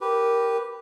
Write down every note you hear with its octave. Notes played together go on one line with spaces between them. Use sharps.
G4 A#4 B4